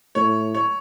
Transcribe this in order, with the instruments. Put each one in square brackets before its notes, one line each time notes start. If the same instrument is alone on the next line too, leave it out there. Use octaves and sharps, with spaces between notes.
[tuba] A2 [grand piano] C#5
[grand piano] C#5